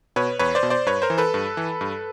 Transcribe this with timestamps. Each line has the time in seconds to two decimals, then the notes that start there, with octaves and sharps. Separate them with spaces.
0.16 B2 B4 C#5
0.39 E2 B4 C#5
0.55 C5 D5
0.63 B2
0.70 C5 D5
0.86 G2 B4 C#5
1.02 A#4 C5
1.10 E3
1.18 A4 B4
1.34 G2
1.57 E3
1.81 G2